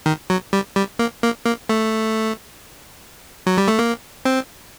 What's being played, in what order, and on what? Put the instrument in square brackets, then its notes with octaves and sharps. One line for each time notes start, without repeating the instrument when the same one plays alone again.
[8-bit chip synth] D#3
F#3
G3
G3
A#3
A#3
A#3
A3
F#3
G3
A3
A#3
C4